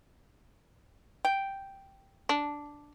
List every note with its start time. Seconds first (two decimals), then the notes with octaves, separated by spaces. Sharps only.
1.25 G5
2.29 D4